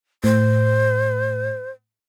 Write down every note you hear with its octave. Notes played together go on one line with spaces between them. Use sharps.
A2 C5